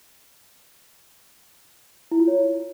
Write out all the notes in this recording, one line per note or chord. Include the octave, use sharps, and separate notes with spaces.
E4
F4
C#5